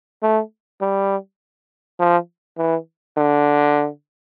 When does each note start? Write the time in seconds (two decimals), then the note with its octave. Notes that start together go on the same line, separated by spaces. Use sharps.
0.22 A3
0.81 G3
2.00 F3
2.58 E3
3.17 D3